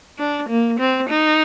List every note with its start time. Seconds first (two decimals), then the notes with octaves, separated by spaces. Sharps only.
0.19 D4
0.49 A#3
0.79 C4
1.09 D#4